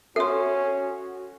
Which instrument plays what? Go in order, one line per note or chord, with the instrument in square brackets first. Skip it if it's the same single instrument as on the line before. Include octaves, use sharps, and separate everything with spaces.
[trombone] C#4 [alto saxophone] F#4 [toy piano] A4 [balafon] E5 C6